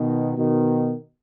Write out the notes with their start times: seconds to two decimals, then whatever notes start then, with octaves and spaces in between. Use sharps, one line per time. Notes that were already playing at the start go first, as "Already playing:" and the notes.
Already playing: B2 D#3
0.37 B2 D#3